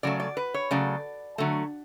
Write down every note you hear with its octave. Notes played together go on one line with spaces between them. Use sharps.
C#3 F#3 A3 D5
D5
B4
C#5
C#3 F#3 A3 D5
D3 F#3 A3